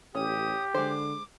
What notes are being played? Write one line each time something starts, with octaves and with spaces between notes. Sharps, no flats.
A1 C#4 G4 D#6
D3 G#3 C5 D6